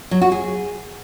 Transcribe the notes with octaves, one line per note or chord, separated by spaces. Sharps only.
F#3
F#4
G#4